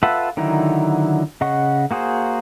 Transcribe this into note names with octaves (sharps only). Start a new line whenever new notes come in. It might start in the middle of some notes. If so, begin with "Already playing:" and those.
F4 A4 B4 E5 F#5
D3 D#3 F#3 D#4 E4
C#3 D#5 F#5 C#6
A#3 F#4 G#4 C5